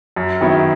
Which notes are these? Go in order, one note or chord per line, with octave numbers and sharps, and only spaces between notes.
F#2
D#3 F#3 B3 E4